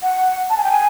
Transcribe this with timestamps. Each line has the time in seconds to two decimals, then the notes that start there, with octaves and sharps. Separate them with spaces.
0.02 F#5
0.50 A5
0.57 G#5
0.64 G5
0.72 G#5